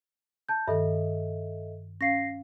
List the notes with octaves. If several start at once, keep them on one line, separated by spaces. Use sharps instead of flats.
A5 G6
G2 D#3 A4 D#5 E5
C#4 F5 A#6 C7